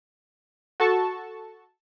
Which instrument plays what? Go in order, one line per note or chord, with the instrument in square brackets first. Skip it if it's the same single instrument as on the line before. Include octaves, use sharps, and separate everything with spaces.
[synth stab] F#4 A4 A5 C#6